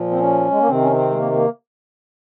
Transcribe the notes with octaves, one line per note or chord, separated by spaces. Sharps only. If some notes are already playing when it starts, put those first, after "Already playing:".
Already playing: A#2 F3
C4
C#4
G#3
A#3
C3 D#3 C4
C#4
C4
G#3
A#3
A#3